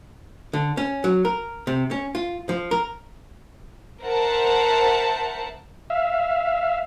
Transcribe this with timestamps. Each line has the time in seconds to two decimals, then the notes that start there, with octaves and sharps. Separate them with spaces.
0.53 D3
0.77 C#4
1.04 F#3
1.25 A#4
1.67 C3
1.91 C#4
2.15 F4
2.49 F3
2.71 A#4
4.04 A#4 C5 E5 F#5 A5
5.90 E5 F5